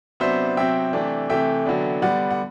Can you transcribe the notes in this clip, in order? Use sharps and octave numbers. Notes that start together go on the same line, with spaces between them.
C3 F#3 B3 D4 C5 E5
C3 F#3 C4 E5 G5
C3 E3 A3 D4
C3 E3 A3 E5 G5
D3 F#3 B3 D4
D3 G3 B3 D5 F#5
F#5